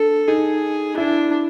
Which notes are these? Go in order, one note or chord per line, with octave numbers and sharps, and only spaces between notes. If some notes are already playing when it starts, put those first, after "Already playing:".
Already playing: D4 A4
D#4 G#4
D4 E4